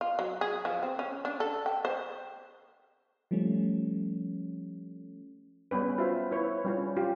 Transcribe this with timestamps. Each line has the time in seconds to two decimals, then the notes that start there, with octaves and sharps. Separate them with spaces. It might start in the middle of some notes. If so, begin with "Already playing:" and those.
0.01 F4
0.19 F#3
0.41 G#4
0.65 F3
0.83 C4
0.99 C#4
1.25 D4
1.40 A4
1.66 G5
1.85 C5
3.31 F3 G3 A3 C#4
5.71 G3 B3 C#4 B4
5.98 F4 F#4 C5 E5 B5
6.31 E4 B4 C#5
6.65 G3 C#4 F4
6.96 F4 G4